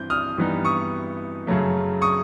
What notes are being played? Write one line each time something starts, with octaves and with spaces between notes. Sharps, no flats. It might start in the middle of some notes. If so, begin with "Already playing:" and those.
Already playing: G2 E3 C4 G6
D#6 F6
G2 E3 G3 B3 D#4
C#6 D#6
F#2 C#3 F#3 A3
C#6 D#6